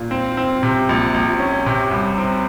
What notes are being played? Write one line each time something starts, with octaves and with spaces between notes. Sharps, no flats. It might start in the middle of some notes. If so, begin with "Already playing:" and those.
Already playing: A#2
C4
C4
C3
A#1
A#1
C#4
C3
C2
C4